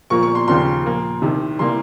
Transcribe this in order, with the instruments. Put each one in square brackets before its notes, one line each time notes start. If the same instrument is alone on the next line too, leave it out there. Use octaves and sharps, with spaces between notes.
[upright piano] A#2 F3 A#3 C#6
C#6
C6
D#2 C#3 F3 A#3 C6
A#2 F3 A#3
C2 C3 D#3
C3 E3 G3 A#3 C6